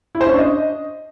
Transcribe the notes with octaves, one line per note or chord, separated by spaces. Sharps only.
E4
C5
C#4
D4
D#5